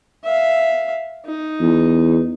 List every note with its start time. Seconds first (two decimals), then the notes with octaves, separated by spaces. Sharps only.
0.24 E5 F5
1.25 D#4
1.61 E2